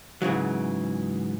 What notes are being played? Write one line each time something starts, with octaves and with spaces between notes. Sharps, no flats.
G#2 C#3 E3 F#3